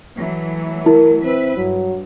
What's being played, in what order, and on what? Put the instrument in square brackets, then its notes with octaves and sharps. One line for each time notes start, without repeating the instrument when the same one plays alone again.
[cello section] E3 F#3 A3
[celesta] E4 [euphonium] A#4
[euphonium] C4 [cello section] B4 E5
[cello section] G2 [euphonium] F#3